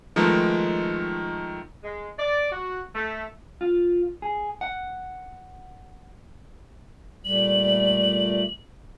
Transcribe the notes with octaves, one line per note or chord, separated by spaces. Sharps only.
D#3 F3 G#3 A3 B3 D#4
G#3
D5
F#4
A3
F4
G#4
F#5
A#2 G3 A3 F#7